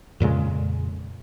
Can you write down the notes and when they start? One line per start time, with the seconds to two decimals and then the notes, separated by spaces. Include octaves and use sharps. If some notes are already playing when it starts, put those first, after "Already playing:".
0.20 F2 A#2 C#3 G#3